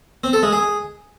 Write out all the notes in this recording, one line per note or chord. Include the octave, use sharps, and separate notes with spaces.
C4
A4
G#3
G#4